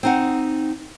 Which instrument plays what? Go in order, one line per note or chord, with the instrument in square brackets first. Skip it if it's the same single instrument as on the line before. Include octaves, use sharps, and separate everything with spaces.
[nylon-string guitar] C4 D#4 F#5